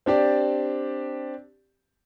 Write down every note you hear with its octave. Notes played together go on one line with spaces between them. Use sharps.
C4 D4 G4 D5